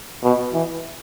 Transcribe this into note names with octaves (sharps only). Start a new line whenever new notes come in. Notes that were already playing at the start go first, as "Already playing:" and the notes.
B2
E3